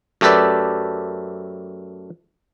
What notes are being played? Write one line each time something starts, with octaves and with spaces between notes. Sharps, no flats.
F#2 A3 G4 A4 B4 D5